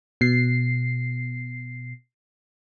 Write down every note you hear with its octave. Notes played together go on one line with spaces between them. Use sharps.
B2 C7